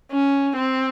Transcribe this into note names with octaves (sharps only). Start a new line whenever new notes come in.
C#4
C4